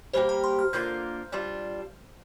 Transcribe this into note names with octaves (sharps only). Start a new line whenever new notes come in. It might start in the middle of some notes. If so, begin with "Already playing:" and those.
G3 A#3 G4 A#4 C5
A#5
C6
F6
D3 A#3 F4 A#4 G6
G3 D4 F4